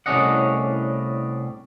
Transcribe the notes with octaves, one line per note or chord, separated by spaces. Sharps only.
C2 A2 C#4 D4 D#5 F#5